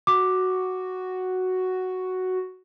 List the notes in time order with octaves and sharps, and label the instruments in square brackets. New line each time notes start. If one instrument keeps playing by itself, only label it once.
[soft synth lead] F#4 [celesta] D6